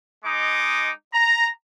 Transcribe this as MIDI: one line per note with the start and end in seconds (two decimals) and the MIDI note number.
0.25 0.91 56
0.25 0.91 63
0.25 0.91 86
1.14 1.48 82